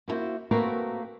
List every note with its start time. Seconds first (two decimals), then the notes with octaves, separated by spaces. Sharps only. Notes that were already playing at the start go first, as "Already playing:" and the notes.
0.08 A#3 B3 E4 F#4 C5
0.51 A3 A#3 C4 F#4 A#4 B4